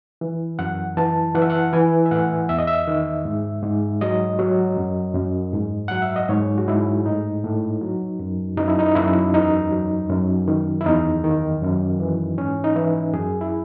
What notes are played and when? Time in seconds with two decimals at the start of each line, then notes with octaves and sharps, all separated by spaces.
0.21 E3
0.59 F#2 F#5
0.97 E3 A5
1.35 E3 F#5
1.42 E5
1.50 F#5
1.73 E3 G#5
2.06 E5
2.11 A2 F#5
2.49 E2 E5
2.59 D#5
2.67 E5
2.87 D#3
3.25 G#2
3.63 G#2
4.01 F#3 D#5
4.39 F#3
4.77 F#2
5.15 F#2
5.53 G#2
5.88 F#3 F#5
6.02 E5
6.16 D#5
6.29 G#2 C#5
6.58 F#4
6.67 G#2 E4
7.06 A2 D#4
7.44 A2
7.82 F#3
8.19 F#2
8.57 F#2 D#4
8.68 E4
8.79 D#4
8.95 F#2 E4
9.34 E2 D#4
9.72 F#3
10.09 F#2
10.48 D#3
10.81 E4
10.86 E2 D#4
11.24 D#3
11.62 F#2
12.00 E3
12.38 G#2 C#4
12.64 D#4
12.76 E3 E4
13.14 F#2 G#4
13.41 E4